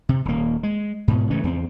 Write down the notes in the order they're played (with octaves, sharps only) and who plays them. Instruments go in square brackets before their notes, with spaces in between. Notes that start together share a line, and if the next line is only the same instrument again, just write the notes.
[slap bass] C3
D#1 A#3
G#3
G#2 B2
C#3 E3 A3 C#4
E2 B3 C4